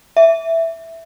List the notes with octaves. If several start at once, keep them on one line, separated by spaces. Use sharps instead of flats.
E5